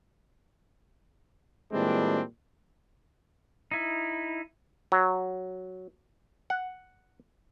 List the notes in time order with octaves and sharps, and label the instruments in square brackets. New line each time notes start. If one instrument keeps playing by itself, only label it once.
[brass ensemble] A#2 E3 G3 G#3 C4 D4
[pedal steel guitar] D#4 E4
[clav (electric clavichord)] F#3
F#5